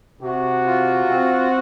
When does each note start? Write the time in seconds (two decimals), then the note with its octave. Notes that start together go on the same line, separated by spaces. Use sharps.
0.21 C3 F#4
0.66 F4
1.10 C4